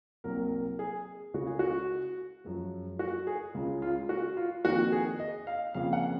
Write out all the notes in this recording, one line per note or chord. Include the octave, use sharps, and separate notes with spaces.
C2 C3 F#3 A#3 A#4
G#4
C#2 C#3 G#3 F#4
G#4
F#4
F#2 F3 G#3
F#4
G#4
C#2 C#3 G#3
F4
F#4
F4
F2 D#3 A#3 F#4
G#4
D#5
F5
F2 C#3 F3 A#3 F5
F#5